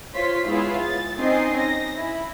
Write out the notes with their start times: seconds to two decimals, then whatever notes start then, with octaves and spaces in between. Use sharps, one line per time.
0.14 F4 C5 C#5 C6 B6
0.47 G#3 B3 E4 F4 G#4 C#5
0.79 A6
1.17 C4 C#4 D#4 D#5 G#5 C7
1.57 A#6
1.96 E4